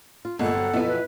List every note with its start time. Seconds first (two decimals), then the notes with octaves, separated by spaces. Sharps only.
0.25 F4
0.39 G1 A#2 G#3 A4 F#5
0.54 F#3 C4
0.73 F2 B2 F#3 B3 E4
0.88 B4